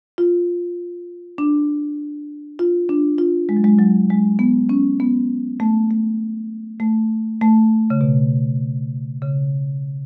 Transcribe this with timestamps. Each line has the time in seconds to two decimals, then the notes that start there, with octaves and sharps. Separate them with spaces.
0.18 F4
1.38 D4
2.59 F4
2.89 D4
3.18 F4
3.49 G#3
3.57 F#3
3.64 G#3
3.79 F#3
4.10 G#3
4.39 B3
4.69 C#4
5.00 B3
5.60 A3
5.91 A3
6.80 A3
7.41 A3
7.90 C#3
8.01 B2
9.22 C#3